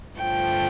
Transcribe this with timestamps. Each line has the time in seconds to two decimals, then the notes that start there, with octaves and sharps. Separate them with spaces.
0.17 G2 D3 F3 A3 G5